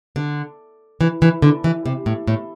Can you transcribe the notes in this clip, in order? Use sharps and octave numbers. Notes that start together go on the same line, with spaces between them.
D3
E3
E3
D3
E3
C3
A2
A2